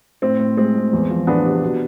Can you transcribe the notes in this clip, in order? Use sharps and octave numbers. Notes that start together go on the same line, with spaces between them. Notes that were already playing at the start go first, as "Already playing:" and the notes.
A2 C4
A2
G#3 C4
G#3
E2
F3
E2 B3 D4
C3
B2